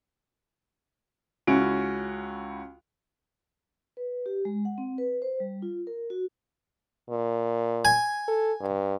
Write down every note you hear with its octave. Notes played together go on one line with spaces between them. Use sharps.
C#2 C#4 E4 F#4 D7
B4
G4
G#3
F#5
C4
B4
C5
G3
F4
A#4
F#4
A#2
G#5
A4
G2